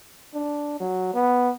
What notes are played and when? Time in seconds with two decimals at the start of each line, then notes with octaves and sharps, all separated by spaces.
0.34 D4
0.80 F#3
1.14 B3